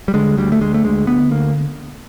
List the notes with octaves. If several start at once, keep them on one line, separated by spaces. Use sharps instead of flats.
G3
D3 G#3
D2 G3
A3
D2 G#3
A3
D3 G#3
D3 B3
D2 A#3